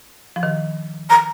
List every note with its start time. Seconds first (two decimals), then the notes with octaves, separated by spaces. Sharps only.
0.36 F3
0.43 D#3
1.09 A#5